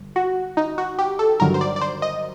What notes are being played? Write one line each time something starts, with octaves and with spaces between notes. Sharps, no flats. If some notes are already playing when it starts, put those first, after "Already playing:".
Already playing: G1
F#4
D#4
F#4
G4
A4
G1 G2 D#3 F#3 A#4
C5
D5
D5
C5
D#5